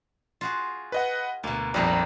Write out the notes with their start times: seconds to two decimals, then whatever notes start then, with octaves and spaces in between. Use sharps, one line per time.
0.41 F4 F#4 G#4
0.92 B4 D#5 F#5
1.43 D2 B2 A#3
1.74 A#1 F2 G3 A#3 D#4